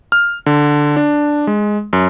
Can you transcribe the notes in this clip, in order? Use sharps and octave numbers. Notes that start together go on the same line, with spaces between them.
F6
D3
D4
G#3
F#2